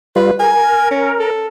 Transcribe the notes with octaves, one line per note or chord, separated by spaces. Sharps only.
G3 F4 B4
A#4 G#5
C#4
A4